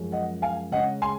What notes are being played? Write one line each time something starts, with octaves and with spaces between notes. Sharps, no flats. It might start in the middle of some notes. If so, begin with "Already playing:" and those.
Already playing: F#2 F3 G#3 C#4
D#5 F#5
F5 G#5
C#3 G#3 C#4 D#5 F#5
G#5 C6